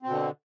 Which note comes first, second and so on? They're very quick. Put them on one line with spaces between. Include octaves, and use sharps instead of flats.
C4 B2 D3